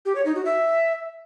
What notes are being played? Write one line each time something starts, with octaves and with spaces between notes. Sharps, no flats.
G4
C#5
D#4
F#4
E5